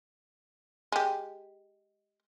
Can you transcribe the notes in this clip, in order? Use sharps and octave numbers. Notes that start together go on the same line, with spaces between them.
G#3 G4